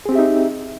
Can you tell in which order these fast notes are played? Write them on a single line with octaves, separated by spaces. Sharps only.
G#4 C4 G4 E5 D#4